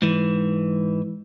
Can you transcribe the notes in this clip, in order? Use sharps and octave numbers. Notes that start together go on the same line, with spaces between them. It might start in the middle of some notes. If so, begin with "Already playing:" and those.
G#2 E3